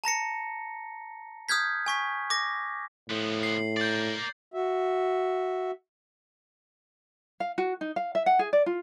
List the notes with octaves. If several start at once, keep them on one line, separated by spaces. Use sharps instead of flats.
A5 A#5 A#6 C#7
D#6 F6 G6 G#6 B6
G#5 C#6 B6
D6 A#6
A2 F3 B3
C7 F#7
A#4 D5 G6 A6
F#4 E5
F5
F#4
D#4
F5
E5
F#5
G#4
D5
F4